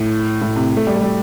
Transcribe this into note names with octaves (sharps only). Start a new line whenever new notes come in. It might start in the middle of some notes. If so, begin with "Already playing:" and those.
Already playing: A2
A2
C3
A3
G3
A3
G3